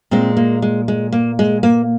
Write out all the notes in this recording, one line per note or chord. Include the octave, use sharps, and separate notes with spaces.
A#2 G#3 C4
A#3
G#3
G#3
A#3
G#3
A#3